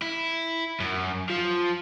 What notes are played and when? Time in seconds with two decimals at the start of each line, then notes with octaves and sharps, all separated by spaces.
0.02 E4
0.80 F#2
1.29 F3